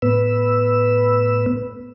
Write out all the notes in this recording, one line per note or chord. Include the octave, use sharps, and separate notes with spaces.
A2 B3 B4 E6